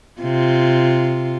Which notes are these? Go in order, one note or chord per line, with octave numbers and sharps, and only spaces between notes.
C3 F4